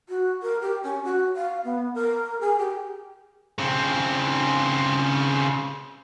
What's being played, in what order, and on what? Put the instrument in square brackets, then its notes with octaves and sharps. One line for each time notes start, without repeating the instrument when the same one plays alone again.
[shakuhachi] F#4
A#4
G4
C#4
F#4
F5
B3
A#4
G#4
G4
[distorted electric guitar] C#3 C4